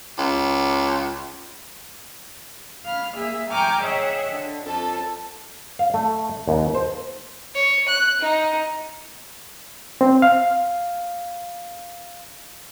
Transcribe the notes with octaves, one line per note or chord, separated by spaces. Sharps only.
C#2
F5 B5 F6
A#3 G#4 E5
G5 G#5 A#5 C#6 D6 F6
G#4 C#5 D#5 E5 F#5 G5
D3
F2 A4 A5
F5
A3
D#2
C5
C#5
F#6
D#4
C4
F5